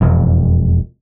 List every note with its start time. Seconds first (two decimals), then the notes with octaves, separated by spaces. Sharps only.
0.01 E1 F2